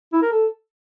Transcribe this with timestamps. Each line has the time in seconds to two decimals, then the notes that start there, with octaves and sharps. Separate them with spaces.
0.12 E4
0.22 A#4
0.31 A4